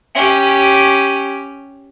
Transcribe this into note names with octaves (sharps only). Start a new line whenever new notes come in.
C#4 G4